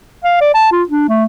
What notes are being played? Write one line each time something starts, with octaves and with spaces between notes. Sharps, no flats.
F5
D5
A5
F4
D4
A3